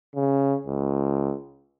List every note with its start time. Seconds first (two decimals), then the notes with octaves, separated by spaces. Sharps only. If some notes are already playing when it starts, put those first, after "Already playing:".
0.16 C#3
0.67 C#2